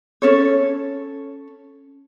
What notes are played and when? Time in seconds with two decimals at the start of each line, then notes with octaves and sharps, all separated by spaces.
0.22 C#4 A4 C#5